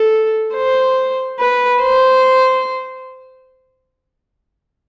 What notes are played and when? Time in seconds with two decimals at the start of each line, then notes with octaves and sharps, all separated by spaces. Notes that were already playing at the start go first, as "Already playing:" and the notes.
Already playing: A4
0.54 C5
1.39 B4
1.81 C5